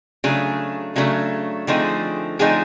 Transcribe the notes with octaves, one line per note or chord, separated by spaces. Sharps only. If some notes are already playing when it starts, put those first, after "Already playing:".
C#3 F#3 A3 D4 G#4
C#3 F#3 A3 D4
D3 F3 A3 C4 D#4 G#4
D3 F3 A3 C4 D#4 G#4